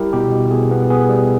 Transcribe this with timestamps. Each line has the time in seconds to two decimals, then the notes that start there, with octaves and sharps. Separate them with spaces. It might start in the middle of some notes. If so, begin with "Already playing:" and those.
Already playing: G3 E4 G4 A#4
0.13 B2 G4
0.32 B2
0.51 B3 G#4
0.71 B3
0.90 B3 G#4
1.09 G3